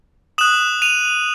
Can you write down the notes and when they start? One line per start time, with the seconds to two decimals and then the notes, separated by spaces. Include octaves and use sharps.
0.38 D#6 F#6 E7 F#7
0.82 D#7 F7